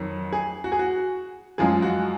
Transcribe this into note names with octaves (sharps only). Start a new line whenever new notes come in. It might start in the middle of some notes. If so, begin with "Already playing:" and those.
Already playing: F2 D#3 F#3
G#4
F#4
G#4
F#4
F#2 F3 G#3 G#4
F#4